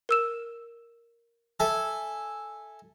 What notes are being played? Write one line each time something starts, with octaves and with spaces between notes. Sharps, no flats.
A#4 E6 E7
A4 E5 G#5